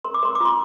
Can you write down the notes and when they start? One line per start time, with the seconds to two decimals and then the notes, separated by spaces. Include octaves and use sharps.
0.04 A#4 C6
0.14 D6
0.23 A#4 C6
0.35 D6
0.41 F4 C6